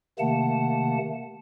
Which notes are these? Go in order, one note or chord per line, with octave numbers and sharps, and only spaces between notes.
C3 D#3 A3 A#3 F#5 A5